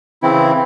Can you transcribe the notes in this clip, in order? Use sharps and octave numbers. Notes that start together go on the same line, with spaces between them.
C#3 E3 C4 E4